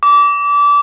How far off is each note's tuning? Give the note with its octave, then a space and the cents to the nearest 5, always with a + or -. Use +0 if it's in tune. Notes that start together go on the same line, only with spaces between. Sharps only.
D6 -25